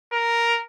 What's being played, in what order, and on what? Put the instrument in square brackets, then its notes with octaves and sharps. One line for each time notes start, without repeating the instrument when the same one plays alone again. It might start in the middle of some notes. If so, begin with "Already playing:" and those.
[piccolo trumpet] A#4